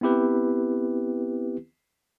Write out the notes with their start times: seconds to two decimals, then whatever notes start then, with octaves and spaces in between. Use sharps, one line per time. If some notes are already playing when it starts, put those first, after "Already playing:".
0.01 B3 C4 E4 G4 B4